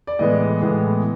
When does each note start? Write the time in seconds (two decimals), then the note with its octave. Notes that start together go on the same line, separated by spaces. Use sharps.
0.07 D5
0.19 A2 E3 G#3 B3 D#5
0.62 A2 E3 G#3 B3